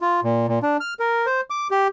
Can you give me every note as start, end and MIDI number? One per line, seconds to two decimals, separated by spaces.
0.01 0.20 65
0.24 0.46 46
0.48 0.59 46
0.63 0.77 62
0.80 0.94 89
0.99 1.26 70
1.26 1.41 72
1.50 1.68 86
1.71 1.88 67